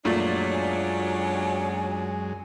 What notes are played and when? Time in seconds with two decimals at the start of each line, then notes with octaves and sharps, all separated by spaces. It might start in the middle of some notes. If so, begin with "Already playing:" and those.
0.05 F#2 A#2 F#3 G#3 A3 C#4 D4 F4
0.52 G#5